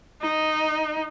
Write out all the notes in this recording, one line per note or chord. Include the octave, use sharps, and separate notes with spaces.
D#4